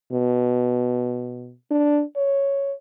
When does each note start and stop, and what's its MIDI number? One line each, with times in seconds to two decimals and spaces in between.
0.12 1.54 47
1.71 2.03 62
2.16 2.73 73